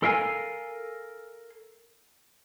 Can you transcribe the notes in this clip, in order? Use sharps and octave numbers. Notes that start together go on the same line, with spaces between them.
A4 A#4 F5 G5 G#5